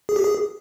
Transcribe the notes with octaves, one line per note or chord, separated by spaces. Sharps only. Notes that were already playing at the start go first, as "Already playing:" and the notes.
G#4
G4
G#4